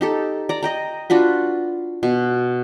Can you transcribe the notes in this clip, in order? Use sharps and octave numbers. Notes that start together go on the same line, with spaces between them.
D#4 G4 A4
D5 A#5
D#5 G5 A#5
D4 F4 F#4 B4
B2